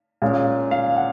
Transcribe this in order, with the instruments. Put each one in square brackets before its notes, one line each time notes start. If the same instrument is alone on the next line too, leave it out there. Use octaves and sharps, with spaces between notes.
[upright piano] A#2 G#3 C#4
F5
F#5